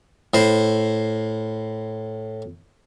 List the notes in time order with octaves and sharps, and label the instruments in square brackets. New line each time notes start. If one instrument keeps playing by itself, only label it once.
[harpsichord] A2 C5